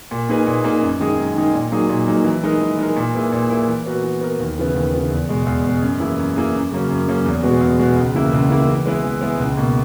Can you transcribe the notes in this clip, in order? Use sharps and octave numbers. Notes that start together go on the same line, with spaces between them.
A#2
A#3 D#4 G#4 B4
A#2
A#3 D#4 G#4 B4
F#2
D#3 G#3 D#4 G#4
F#2
D#3 G#3 D#4 G#4
A#2
F#3 A#3 D#4 G#4
A#2
F#3 A#3 D#4 G#4
E3
G#3 D#4 A#4
E3
G#3 D#4 A#4
A#2
A#3 E4 G#4 B4
A#2
A#3 E4 G#4 B4
E3
B3 F#4 A#4
E3
B3 F#4 A#4
D#2
C#3 E3 B3
D#2
C#3 E3 B3
E2
B2 G#3
E2
B2 G#3
F#2
E3 A#3 E4 G#4
F#2
E3 A#3 E4 G#4
F#2
C#3 F#3 A#3 C#4
F#2
C#3 F#3 A#3 C#4
E2
B2 G#3 B3 F#4
E2
B2 G#3 B3 F#4
C#2
C#3 E3 A#3 E4
C#2
C#3 E3 A#3 E4
E3
G#3 B3 E4 B4
E3
G#3 B3 E4 B4
C#2
B2 A#3